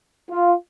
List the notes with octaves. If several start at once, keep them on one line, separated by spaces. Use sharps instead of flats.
F4